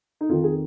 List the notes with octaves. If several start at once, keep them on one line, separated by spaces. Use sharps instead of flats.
D#4
F2 D#3 F4
G#4